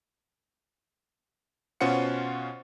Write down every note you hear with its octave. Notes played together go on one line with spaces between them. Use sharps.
B2 C#4 F4 C5 F#5 C#7